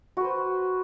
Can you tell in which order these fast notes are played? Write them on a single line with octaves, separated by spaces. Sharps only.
F#4 B4 C5